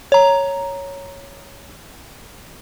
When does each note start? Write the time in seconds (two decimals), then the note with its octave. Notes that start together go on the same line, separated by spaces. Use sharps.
0.12 C#5 A#5